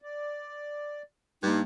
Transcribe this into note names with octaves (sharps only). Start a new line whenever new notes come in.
D5
G2 G3 A#3 D#4